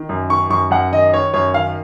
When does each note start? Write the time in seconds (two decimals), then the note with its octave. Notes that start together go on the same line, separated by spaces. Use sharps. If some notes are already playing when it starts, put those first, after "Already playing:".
Already playing: D#3
0.09 F#2
0.29 D#3 C#6
0.50 F#2 C#6
0.71 F#2 F#5
0.92 D#3 D#5
1.14 D#3 C#5
1.34 F#2 C#5
1.54 D#3 F5